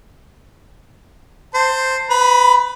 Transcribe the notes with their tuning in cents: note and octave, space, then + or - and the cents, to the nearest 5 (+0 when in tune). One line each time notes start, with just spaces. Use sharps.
C5 +0 A5 +30
B4 +25 B5 -30